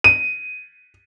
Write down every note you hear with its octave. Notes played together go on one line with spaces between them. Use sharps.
D#7